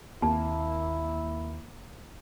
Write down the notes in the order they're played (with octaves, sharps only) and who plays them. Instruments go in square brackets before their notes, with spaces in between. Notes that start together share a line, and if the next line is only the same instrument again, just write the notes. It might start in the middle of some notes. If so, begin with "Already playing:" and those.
[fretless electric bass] D#2 C4 [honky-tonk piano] A#3 [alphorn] E4 [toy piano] A5